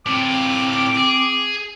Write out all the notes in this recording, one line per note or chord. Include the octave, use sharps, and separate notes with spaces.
A2 C4 F4 D6
G#4